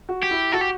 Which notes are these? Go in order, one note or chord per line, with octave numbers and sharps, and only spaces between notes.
F#4
G4
E4
F#4 A4
G4